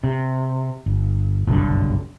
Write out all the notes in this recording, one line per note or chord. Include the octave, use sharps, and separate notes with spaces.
C3
G1
F#1 B1 G2 D3